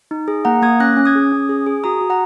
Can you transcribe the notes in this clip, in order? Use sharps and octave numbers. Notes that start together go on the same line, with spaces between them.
D#4
G#4
A#3 F#5 A#5
A#3 D#6 G#6
C#4 F#6 A#6
C#4
D#6 G#6
G#4
C#4
G#4
G#4
F#4 A#5 D#6
F#4
F#5 A#5